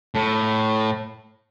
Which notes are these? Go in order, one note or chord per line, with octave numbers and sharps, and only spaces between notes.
A2